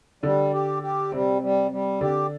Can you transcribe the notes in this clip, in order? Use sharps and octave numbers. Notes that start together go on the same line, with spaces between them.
D3 G3 D4
G4
G4
C3 G3 C4
G3
G3
D3 D4 G4